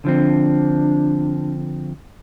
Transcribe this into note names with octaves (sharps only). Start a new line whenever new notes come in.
D3 F3 C4 D4